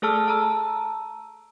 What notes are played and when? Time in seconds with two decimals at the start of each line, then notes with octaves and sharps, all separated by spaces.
0.02 A3 G#4 A4 A5 E6 F6
0.28 A5 A#5 E6